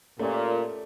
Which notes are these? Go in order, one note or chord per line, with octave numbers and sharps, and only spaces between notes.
A#2 A3 C#4 G4 A#4 D5